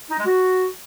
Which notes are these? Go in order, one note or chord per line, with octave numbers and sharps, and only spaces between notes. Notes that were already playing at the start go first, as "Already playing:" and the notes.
D#4
G#3
F#4